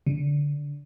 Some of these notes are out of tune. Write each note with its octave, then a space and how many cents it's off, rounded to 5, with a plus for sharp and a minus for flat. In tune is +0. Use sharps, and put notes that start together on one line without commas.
D3 -15